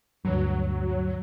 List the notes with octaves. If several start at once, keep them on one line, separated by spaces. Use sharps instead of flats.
D2 G2 F#3